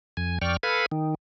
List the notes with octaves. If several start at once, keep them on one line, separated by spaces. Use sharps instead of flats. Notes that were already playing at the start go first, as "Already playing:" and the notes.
F2 G#5
F2 D5 G5 C#6 F6
A4 B4 F5 G#5 B5
D#3